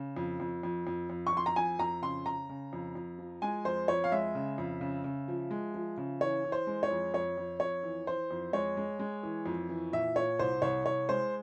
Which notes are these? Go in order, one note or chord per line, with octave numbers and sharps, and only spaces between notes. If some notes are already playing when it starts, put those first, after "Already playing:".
Already playing: C#3
F2
F2
F2
F2
F2
C#6
F2 C6
A#5
F2 G#5
F2 A#5
C#3 C6
C#3 A#5
C#3
F2
F2
F3
G#3 G#5
F2 C5
F2 C#5
F5
G#3 E5
C#3
F2
C#3
C#3
F3
G#3
F3
C#3
E3 C#5
E3
C5
G#3
C#5
F2
F2 C#5
F2
F2 C#5
E3
E3 C5
F2
G#3 C#5
G#3
G#3
E3
F2
E3
A#2 E5
A#2 C#5
C2 C5
C2 C#5
C2 C#5
G#3 C5